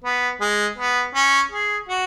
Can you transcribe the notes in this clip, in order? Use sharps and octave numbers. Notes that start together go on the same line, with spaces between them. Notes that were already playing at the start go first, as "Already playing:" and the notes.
B3
G#3
B3
C#4
G#4
F#4